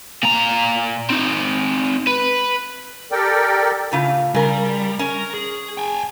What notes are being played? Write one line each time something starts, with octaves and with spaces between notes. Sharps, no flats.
A#2 A#5
C4 D#4
B4
G4 A4 A#4 D5 G5
A2 C#3 F4
C#3 G3 A#4
C#4 A#4
G#4
G5 G#5